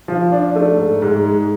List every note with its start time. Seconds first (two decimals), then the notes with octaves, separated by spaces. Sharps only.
0.08 F3
0.32 D4
0.56 A3
0.78 G#2
1.02 G#2
1.25 G#3